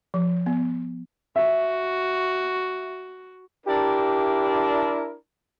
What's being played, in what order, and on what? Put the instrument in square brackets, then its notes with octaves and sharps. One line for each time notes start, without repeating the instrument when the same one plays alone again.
[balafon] F3
B3
[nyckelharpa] F#4 [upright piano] E5
[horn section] D4 E4 A#4 [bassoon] G4